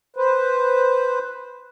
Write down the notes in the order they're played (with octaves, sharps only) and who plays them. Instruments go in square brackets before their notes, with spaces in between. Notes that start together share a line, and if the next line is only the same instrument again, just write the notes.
[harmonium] B4 C5